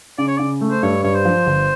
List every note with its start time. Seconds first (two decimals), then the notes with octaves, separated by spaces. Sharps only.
0.18 C#3 D5
0.28 C#5
0.37 C#3 D5
0.61 A3
0.71 C5
0.83 G2 C#5
1.03 G2 C#5
1.14 C5
1.25 F3
1.46 G1